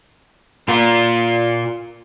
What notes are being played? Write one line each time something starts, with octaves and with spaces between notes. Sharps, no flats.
A#2 A#3 F4 A#4